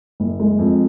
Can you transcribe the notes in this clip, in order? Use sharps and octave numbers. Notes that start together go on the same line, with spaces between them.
F#1
G#3
F2